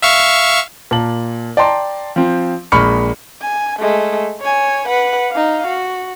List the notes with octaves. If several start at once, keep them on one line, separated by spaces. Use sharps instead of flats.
E5 F5 C#6
A#2 A5 F#7
D5 G5 A5 A#5 C6
F3 C4
A#1 G#3 B5 C#6 F6 C#7
G#5
G#3 A3
C#5 G#5
B4 F#5
D#4 F5
F#4